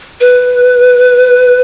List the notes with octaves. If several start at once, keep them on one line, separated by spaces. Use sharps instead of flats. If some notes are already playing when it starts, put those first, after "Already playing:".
B4